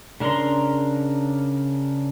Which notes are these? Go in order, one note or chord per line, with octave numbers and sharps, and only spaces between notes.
C#3 D4 A#4 A#5 C6